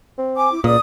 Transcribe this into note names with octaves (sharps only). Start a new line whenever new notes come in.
C4
G#5 D6
E4
C#2 A#2 D5 D#6